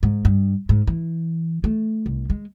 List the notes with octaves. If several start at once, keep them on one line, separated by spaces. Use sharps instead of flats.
G#2
G2
G#2
E3
A3
C2
G#3